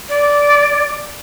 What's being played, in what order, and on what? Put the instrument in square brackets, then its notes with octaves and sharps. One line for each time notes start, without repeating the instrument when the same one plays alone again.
[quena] D5